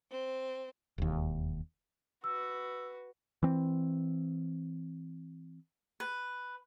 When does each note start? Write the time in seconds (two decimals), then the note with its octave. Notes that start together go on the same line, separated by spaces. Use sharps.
0.11 C4
0.98 E1 D#2
2.24 F#4 B4 E6
3.43 E3 C4
6.00 B4